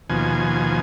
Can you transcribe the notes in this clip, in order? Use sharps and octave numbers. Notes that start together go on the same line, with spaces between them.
D#2 B2 F3 G#5